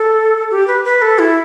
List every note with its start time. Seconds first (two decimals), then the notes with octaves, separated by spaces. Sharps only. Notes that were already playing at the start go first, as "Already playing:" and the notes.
Already playing: A4
0.51 G4
0.68 B4
0.85 B4
1.02 A4
1.19 E4